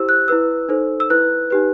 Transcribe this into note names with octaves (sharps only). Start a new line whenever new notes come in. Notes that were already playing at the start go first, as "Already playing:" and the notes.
Already playing: E4 G4 C5 E6
F#6
E4 B4 E6
D#4 A4 C5
E6
E4 B4 F#6
D#4 G4 B4